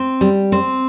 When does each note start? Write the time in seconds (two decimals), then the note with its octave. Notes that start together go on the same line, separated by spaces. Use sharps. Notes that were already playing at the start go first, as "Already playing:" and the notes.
Already playing: C4
0.21 G3
0.52 C4